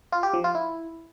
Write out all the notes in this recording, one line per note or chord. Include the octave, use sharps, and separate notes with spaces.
F4
G4
F3
F4
E4